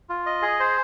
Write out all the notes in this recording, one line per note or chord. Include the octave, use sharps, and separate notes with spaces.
F4
D#5
G#4
C5